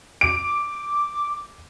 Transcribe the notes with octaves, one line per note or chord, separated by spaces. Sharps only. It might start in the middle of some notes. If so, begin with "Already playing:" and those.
D6 D7